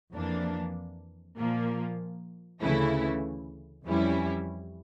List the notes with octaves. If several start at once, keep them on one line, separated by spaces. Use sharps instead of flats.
F2 E3 A#3 D4
A#2 F3 A#3
D2 C#3 E3 A3 E4
F2 E3 G3 C#4 E4